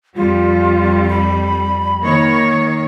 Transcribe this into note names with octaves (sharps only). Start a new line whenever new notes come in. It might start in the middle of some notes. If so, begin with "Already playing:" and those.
F2 G3 F4
B5
D#3 A#3 C#5